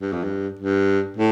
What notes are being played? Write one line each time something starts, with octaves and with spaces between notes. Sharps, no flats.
G2
F2
G2
G2
A2